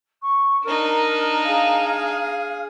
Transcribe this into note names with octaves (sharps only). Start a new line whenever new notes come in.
C#6
D4 D#4 A#4
G#4 F5 G#5